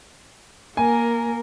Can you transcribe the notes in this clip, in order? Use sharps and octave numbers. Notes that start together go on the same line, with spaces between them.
A#3 A#4 G#5